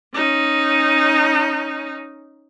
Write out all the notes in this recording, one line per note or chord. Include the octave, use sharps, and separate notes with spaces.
C#4 D#4